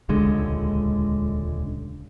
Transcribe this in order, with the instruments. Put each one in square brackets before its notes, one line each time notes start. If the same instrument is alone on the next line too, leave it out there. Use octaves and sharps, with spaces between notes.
[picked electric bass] D#1 C#2 D3 G#3